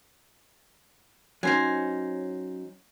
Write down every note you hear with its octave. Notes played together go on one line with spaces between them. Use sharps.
F#3 C#4 D#4 C5 G#5